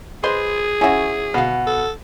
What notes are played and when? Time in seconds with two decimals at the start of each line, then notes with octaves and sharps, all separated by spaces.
0.24 G#4 B4 C5 D#5 C6
0.81 C#4 E4 F#4 C#5 E5
1.34 B2 F5 F#5 B5
1.67 A4